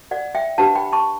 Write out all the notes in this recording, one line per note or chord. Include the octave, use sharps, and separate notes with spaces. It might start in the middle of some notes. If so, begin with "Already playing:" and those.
D5 F#5
E5 G5
D4 G4 B4 F#5 A5
G5 B5
A5 C#6